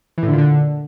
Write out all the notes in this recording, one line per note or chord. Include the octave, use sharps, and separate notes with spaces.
E3
A2
D3
A#2
D3